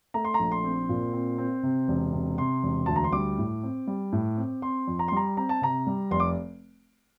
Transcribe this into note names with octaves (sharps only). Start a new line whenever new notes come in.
A3 A#5
C6
A#5
A#1
C6
C4
A#2
C4
C4
C3
E1
C3
C3 C6
E1
D2 A5
A#5
C6
G3 D6
A2
C4
G3
A2
C4
C4 C6
F2
A#5
C6
G3 A#5
C4 A#5
A5
C3 A#5
G3
F1 C6
D6